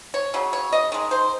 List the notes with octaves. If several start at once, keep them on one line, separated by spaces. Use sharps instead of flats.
C#5
C#3 F#3
C#5
D#5
D#3 G#3
C5